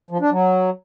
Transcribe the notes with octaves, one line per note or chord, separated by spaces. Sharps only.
F3
D4
F#3